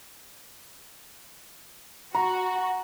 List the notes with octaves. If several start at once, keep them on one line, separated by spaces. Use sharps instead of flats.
F#4 A#5